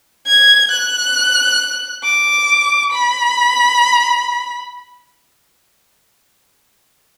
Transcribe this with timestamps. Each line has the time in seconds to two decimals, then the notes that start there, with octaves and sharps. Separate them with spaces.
0.27 G#6
0.72 F#6
2.04 D6
2.92 B5